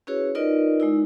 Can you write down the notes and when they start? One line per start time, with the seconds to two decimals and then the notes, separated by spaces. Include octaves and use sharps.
0.07 C#4 E4 F#4 G#4 B4 C#5
0.35 D#4 F4 A#4 B4 D5 D#5
0.80 G#3 D#4 E4